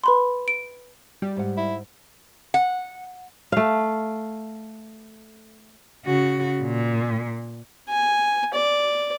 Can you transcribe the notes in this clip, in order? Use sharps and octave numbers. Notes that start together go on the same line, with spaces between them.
B4 B5 C6
D7
G3 G4
G#2 F#5
E4
F#5
A3 F5
C#3 F#4
A#2
G#5
D5